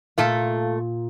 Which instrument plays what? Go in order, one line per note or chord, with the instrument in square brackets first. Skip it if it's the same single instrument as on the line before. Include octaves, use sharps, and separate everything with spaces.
[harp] A#2 [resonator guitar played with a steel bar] A3 A4 F5